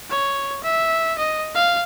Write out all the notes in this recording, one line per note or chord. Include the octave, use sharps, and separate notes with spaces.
C#5
E5
D#5
F5